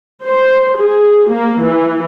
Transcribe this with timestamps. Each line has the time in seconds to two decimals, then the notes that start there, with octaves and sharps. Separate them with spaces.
0.24 C5
0.79 G#4
1.31 A#3
1.64 E3